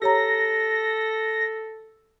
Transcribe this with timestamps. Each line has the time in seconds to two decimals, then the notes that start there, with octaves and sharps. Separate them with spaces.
0.02 G4 A4 C#5 A#5 A#6